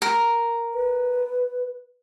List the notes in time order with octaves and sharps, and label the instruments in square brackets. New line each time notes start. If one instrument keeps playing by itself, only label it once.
[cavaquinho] A#4
[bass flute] B4